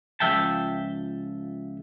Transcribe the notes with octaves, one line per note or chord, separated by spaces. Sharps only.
C#2 F3 E5 G5 A5